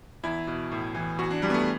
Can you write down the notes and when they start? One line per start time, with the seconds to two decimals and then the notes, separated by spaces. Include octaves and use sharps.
0.23 E2 E4
0.47 B2
0.72 A2
0.95 E3
1.18 E2 F#4
1.31 D4
1.42 E2 G3
1.50 B3
1.54 A3